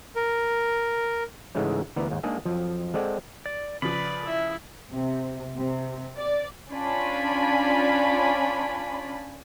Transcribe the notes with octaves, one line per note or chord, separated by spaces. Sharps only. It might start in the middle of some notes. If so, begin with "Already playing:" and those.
A#4
G#2 C#3 E3 G#3 A3 C#4
D2 E3 B3 D5 A#5
D#2 G#2
G#3 A#3 D4 D#4 G#4
F2 F3 F#3
G#3 C4 A4 D5 F#5
D5
C#3 F3 B4 D5 B5
E4 E5
C3
C3
D5
C#4 D4 F4 D5 G#5 B5